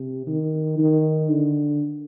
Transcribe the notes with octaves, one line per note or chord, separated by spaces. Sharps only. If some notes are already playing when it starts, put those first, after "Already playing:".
Already playing: C3
D#3
D#3
D3